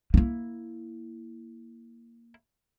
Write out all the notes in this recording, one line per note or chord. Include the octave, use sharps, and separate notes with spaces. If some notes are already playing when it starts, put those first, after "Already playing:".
A#3 E4